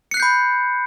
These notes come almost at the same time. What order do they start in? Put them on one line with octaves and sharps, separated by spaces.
C#7 F#6 C7 G6 B5